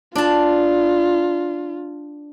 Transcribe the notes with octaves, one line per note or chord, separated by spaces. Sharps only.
D4 F4 A5